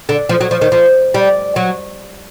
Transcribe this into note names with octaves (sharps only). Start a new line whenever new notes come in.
D3
F3
F#3
F3
D#3
F3
G3
F#3